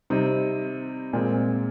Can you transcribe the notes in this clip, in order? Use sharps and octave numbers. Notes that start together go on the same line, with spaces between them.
C3 G3 C4 D#4
A#2 G#3 C4